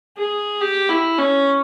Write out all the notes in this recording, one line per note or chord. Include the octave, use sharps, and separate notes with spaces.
G#4
G4
E4
C#4